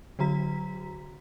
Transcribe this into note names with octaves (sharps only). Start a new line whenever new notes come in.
D3 F#3 F#4 A#5 B6